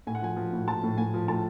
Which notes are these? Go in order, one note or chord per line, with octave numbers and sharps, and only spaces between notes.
A2 G#5
F#5
F3 G#5
F3
A2
F3 A5
A2
A2 G#5
F3
A2 A5